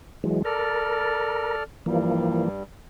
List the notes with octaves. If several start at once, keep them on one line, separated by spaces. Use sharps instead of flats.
E3 F#3 G#3
A4 A#4 D5 F6
G2 E3 F3 G3 A#3